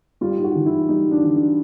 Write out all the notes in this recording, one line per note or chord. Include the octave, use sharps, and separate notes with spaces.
G3 F4
G#2
F#4
E3
E4
G#2
G3 D#4
G#2 D4
E3
D4